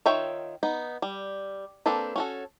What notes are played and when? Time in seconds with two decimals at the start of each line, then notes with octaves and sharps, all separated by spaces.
0.06 D#3 F4 C#5 E5 G5
0.63 B3 D#4
1.02 G3
1.86 A#3 C4 D4 A4 B4
2.16 C#4 F#4 A4